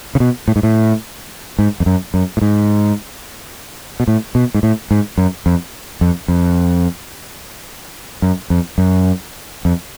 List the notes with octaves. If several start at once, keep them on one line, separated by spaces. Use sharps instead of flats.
C#3
B2
A2
G#2
A2
G#2
F2
F#2
F#2
A2
G#2
B2
A2
B2
G#2
A2
G#2
F#2
F2
F2
F2
F#2
F2
F#2
F2